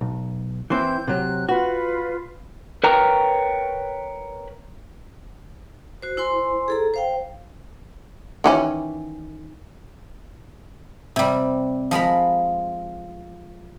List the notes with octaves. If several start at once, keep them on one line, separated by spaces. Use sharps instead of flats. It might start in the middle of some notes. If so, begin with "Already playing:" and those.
B1
E3 C4 E4 G6
C3 F#3 F#6
F4 F#4 B4
A#4 B4 C#5 G5 A#5
F#4 C5
E4 C5 G#5 C6
G#4 A4 A#5
C5 F5 G5
D#3 E3 C#4
C3 G3
F3 G#3 A#4 B5